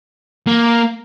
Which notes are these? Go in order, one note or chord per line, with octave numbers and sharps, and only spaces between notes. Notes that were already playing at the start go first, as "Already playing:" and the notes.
A#3